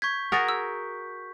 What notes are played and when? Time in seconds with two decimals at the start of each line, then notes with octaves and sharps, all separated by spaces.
0.02 C#6 G6 G#6 B6
0.32 F#4 G#4 A#4 F#5 A6 A#6
0.49 E6